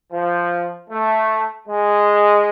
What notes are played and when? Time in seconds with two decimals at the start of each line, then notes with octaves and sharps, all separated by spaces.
0.12 F3
0.90 A3
1.68 G#3